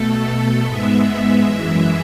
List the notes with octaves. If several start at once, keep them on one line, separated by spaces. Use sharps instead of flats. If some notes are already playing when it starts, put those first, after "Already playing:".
Already playing: B2 A3 A4
A4
G#2 G#3 B3 E5
F#2 E3 G#3 E5